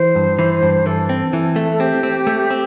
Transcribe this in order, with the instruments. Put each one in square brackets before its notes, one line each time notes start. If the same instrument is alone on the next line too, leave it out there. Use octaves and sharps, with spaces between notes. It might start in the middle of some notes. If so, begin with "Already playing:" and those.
Already playing: [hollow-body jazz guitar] E3 [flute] C5
[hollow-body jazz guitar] G2
E3
G2
[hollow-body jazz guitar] E3 [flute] A4
[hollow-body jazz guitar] C4
E3
A3
[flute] A4
[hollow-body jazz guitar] C4 [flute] G4
[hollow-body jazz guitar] C4
A3
C4